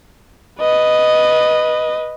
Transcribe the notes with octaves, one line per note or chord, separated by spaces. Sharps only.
B4 D#5